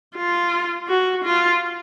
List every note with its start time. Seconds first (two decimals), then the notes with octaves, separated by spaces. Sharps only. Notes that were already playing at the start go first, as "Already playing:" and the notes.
0.17 F4
0.88 F#4
1.24 F4